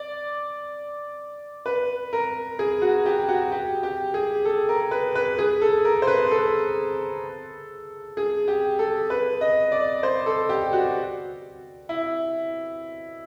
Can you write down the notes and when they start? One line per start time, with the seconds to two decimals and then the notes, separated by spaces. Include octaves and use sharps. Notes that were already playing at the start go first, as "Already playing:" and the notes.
Already playing: D5
1.66 B4
2.13 A#4
2.59 G#4
2.82 F#4
3.06 G4
3.29 F#4
3.52 G4
3.83 G4
4.14 G#4
4.45 A4
4.69 A#4
4.91 B4
5.15 B4
5.38 G#4
5.62 A4
5.85 A#4
6.02 C5
6.07 B4
6.31 A4
8.17 G#4
8.48 G4
8.79 A4
9.10 B4
9.41 D#5
9.72 D5
10.03 C5
10.26 A4
10.49 G4
10.73 F#4
11.89 E4